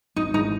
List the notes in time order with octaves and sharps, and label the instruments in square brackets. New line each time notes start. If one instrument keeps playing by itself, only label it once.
[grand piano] G#1 [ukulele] D#4
[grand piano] G#2 E3 G#3 [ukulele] D#4